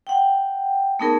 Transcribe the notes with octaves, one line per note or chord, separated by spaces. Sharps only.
F#5 G5
A3 B3 D#4 G#4 A#4 B5